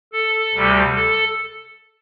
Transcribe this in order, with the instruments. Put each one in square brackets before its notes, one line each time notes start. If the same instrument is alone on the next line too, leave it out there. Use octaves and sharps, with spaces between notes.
[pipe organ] A4
D2 C3 G3
A4